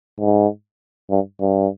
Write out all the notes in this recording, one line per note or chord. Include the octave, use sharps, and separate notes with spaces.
G#2
G2
G2